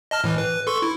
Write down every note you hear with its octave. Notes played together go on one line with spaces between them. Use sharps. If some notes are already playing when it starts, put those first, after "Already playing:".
D#5 A5 F6
A2 E3
B4
A4 C6 C#6
E4